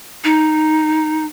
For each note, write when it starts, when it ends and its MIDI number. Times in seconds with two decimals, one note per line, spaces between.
0.24 1.25 63